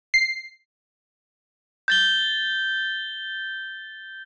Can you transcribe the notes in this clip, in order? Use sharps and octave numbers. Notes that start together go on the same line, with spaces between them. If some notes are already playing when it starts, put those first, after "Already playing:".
C7
G6 A6 G7